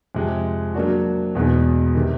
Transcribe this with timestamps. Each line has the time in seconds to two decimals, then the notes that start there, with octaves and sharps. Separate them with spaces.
0.15 F2 C3 F3 G#3
0.74 F#3 A#3 D4 F#4
1.35 E2 B2 G#3 B3 D#4
1.95 C3 D#3